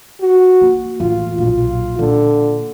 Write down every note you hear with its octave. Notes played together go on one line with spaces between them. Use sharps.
F#4
A#3
A1 D#2 F4
B1 A#2 F4
A#2 D3